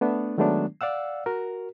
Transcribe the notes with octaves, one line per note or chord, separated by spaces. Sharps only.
A3 B3 D4
D#3 F#3 G#3 A3 B3 D4
D5 F5 F#5 E6
F#4 A#4